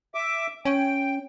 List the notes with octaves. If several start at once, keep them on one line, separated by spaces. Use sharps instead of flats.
E5 D6
C#4 G5